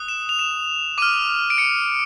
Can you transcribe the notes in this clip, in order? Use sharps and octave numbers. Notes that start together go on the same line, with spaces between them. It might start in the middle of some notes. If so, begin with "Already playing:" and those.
Already playing: D#6 F#6
E7
F7
E7
D6 F6 D#7
D7
C#7